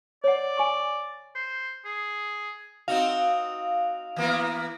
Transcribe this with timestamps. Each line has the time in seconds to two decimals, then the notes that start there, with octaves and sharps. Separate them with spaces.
0.24 C#5 D5 F#5
0.57 G#5 C#6
1.35 C5
1.85 G#4
2.88 C4 D#4 F#4 F5
4.16 E3 A#3 B3